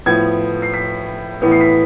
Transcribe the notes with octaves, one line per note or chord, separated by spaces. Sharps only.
A2 F3 B3 G#6
C7
B6
A2 E3 B3
C7
B6